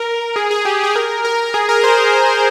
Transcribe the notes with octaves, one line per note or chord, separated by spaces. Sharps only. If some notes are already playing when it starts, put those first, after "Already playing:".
Already playing: A#4
G#4
G#4
G4
G#4
A#4
A#4
G#4
A#4
C5